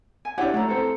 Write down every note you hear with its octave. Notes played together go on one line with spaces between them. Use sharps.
G#5
D4 E4 G4 C#5 F#5
A3 E4 A#5
C4 A4